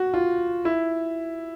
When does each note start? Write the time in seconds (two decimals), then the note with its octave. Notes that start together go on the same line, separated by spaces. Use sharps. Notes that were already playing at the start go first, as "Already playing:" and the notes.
Already playing: F#4
0.14 F4
0.65 E4